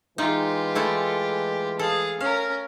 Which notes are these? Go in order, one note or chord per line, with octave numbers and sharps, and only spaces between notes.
E3 G#3 D#4 F4 G4
A3 E4 A4
G#4 A4 F5
C#4 A#4 F5